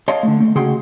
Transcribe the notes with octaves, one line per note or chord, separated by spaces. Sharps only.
C#5 D#5 F5 G5 A5 C6
D3 A3
A3
C#3 F#4 G#4 F#5 G5 C6